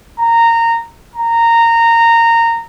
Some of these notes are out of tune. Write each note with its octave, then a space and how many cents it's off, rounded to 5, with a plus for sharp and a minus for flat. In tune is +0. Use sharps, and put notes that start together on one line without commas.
A#5 -15
A#5 -15